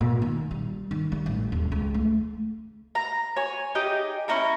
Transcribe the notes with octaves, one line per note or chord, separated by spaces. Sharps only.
A#2
D#3
G3
D#3
G3
A1
D#1
C#2
A3
A#5
C#5 G#5
D#4 G4 G#4 D#5
C#4 E4 A#5 C#6